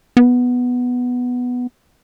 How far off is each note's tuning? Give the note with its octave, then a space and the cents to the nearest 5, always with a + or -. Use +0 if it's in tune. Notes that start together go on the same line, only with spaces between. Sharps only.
B3 +0